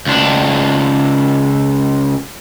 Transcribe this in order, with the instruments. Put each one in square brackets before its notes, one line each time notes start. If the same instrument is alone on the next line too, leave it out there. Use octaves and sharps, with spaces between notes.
[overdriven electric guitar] C#2 D4